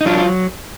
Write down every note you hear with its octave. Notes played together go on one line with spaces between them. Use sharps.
D#4
F#3 D4 F4
F4